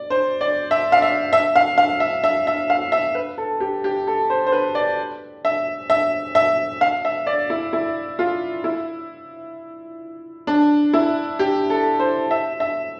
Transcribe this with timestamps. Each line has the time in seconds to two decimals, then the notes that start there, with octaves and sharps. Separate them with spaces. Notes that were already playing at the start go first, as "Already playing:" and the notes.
Already playing: D5
0.10 C5
0.41 D5
0.71 E5
0.92 F5
1.02 E5
1.33 E5
1.56 F5
1.78 F5
2.00 E5
2.24 E5
2.47 E5
2.70 F5
2.92 E5
3.15 B4
3.38 A4
3.60 G4
3.84 G4
4.07 A4
4.30 C5
4.47 C5
4.52 B4
4.75 D5
5.45 E5
5.90 E5
6.35 E5
6.81 F5
7.05 E5
7.27 D5
7.50 E4
7.73 E4
8.19 F4
8.64 E4
10.47 D4
10.93 E4
11.39 G4
11.70 A4
12.00 C5
12.31 E5
12.60 E5